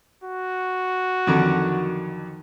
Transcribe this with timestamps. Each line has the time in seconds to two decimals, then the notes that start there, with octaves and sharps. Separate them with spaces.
0.24 F#4
1.27 F2 D3 D#3 F#3 D6